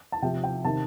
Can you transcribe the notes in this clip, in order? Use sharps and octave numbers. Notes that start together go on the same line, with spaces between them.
A5
C3 F3 G5
G5
C3 D#3 A5